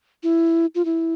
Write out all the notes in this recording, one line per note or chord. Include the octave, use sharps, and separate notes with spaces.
E4
F4
E4